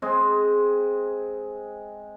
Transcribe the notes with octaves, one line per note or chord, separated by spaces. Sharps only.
G#3 C4 G#4